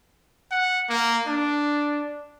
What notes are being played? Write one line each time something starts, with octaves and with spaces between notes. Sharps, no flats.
F#5
A#3
D4